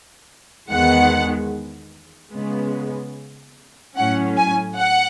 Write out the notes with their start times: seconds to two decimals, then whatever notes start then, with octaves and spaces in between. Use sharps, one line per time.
0.71 E2 D#3 G#3 B3 F#5
2.34 C#3 G#3 B3
3.96 A2 F#3 C#4 F#5
4.37 G#5
4.77 F#5